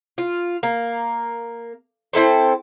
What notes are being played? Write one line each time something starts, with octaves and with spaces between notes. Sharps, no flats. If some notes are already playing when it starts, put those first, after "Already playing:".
F4
A#3
C4 E4 A4 C5